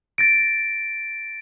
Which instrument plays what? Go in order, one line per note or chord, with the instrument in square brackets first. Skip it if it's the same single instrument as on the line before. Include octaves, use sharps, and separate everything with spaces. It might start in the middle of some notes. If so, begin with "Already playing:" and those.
[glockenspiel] A6 A#6 D7